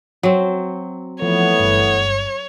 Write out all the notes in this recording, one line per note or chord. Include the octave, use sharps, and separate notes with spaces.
F#3 C4
E3 F3 A3 B3 C#5
G1 G2